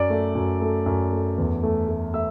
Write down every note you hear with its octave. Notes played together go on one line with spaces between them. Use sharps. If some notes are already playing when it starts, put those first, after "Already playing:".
Already playing: F#2 D5 D6
A3
F#2
A3
F#2
A3
E2
A3
A3
A3 E5 E6